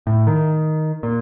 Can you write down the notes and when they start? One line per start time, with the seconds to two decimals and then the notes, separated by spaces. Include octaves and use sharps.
0.07 A2
0.27 D#3
1.03 A#2